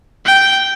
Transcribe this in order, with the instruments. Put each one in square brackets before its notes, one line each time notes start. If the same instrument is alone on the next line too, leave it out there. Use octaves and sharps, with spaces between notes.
[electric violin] G5